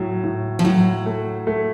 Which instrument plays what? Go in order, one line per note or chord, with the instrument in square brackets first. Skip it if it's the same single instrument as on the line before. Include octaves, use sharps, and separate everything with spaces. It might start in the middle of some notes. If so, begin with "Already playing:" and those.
Already playing: [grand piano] A2 F#3
A2
[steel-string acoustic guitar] F3
[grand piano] A2 [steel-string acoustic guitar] F#3
[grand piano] A3
A3